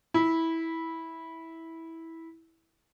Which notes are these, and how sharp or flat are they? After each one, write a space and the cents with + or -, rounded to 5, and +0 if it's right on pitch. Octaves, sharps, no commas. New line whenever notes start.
E4 -15